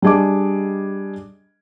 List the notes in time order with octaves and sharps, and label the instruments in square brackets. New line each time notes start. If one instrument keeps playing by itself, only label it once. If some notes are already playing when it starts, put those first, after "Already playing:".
[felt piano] G3 D4 G#4 D#5 D6